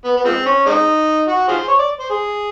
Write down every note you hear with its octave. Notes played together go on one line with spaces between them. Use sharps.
B3
B3
F3 G#3 C4
C#4
G#3 C4 D#4
F#4
F4 G#4 C5
C#5
D5
C5
G#4